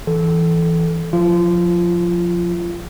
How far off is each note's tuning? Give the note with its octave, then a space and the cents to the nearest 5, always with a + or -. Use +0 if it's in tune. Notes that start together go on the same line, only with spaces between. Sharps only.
E3 +0 A4 -15
F3 +25 F4 -25